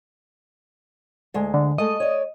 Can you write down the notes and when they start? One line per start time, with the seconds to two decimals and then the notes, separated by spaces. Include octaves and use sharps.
1.34 D2 G#3
1.54 D3
1.78 G#3 A3 D#5
2.00 C#5 D5